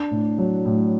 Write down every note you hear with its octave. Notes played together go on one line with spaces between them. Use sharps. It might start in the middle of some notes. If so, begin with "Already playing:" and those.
Already playing: D4
A2
F#3
A2